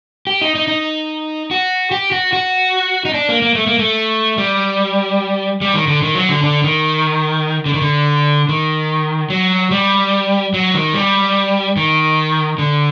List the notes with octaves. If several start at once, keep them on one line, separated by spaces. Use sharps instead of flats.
G4
D#4
D#4
D#4
F#4
G4
F#4
F#4
D#4
D4
A#3
A#3
A3
A#3
A3
G3
G3
D#3
D3
D#3
F#3
D3
D3
D#3
D3
D#3
D3
D#3
F#3
G3
F#3
D#3
G3
D#3
D3